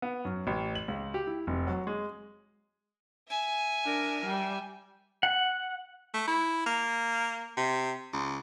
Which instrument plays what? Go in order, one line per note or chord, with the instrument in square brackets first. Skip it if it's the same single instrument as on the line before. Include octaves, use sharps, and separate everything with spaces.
[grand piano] B3
F#2
A1
F#7
C#2
G4
E4
F1
F#3
G#3
[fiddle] E5 G#5
[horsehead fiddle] D4 A#4
G3
[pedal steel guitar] F#5
[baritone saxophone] A3
E4
A#3
C3
C#2